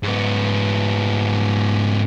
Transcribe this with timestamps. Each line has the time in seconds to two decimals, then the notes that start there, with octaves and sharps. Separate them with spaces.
0.03 G#2 B3